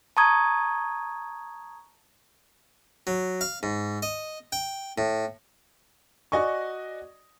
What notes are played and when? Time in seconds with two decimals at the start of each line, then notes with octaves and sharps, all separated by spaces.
0.17 A5 A#5 C#6 D#6 G#6
3.07 F#3
3.41 F5
3.63 G#2
4.02 D#5
4.52 G5
4.98 A2
6.32 F#4 D5 D#5 G#5 C#6